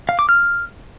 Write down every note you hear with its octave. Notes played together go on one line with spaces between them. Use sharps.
F5
D6
F6